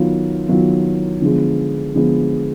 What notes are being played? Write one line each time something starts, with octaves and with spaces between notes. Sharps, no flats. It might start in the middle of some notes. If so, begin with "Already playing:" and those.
Already playing: D#3 F#3 B3 F4
D#3 F#3 B3 F4
D3 F3 G#3 B3
D3 F3 G#3 B3